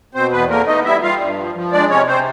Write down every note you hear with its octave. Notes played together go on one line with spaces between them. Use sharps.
B2 C4 C5
E2 B3 B4
A3 A#3 A#4
B3 D#4 D#5
G3 E4 E5
G3 F4 F5
G2
F3
F3
G#3 D4 D5
C3 C#4 C#5
C3 C4 C5